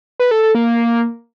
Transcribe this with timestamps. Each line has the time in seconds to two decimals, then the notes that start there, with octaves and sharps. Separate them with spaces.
0.19 B4
0.31 A4
0.43 A4
0.55 A#3